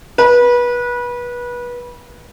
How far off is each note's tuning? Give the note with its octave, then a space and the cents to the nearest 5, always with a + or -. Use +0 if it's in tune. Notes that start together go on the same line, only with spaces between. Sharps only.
B4 -25